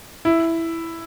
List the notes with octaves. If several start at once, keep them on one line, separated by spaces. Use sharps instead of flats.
E4